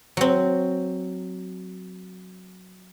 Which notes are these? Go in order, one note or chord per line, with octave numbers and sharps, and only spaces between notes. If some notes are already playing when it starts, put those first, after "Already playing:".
F#3 C4